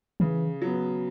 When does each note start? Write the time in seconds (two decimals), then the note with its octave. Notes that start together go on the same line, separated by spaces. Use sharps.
0.20 C#3 E3
0.62 F#3 B3